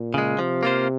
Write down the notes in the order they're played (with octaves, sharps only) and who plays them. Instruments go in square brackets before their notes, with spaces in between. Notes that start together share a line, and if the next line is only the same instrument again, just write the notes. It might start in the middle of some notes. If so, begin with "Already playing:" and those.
Already playing: [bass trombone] A#2
[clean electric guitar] C#3 G#3
[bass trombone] C3 [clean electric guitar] F3
[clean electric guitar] A#3 F4 C5